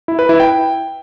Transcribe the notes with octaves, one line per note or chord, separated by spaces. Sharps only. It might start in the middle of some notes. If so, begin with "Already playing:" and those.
E4
B4
E4
G5